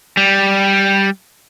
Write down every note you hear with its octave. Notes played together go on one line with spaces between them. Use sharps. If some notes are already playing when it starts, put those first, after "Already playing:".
G3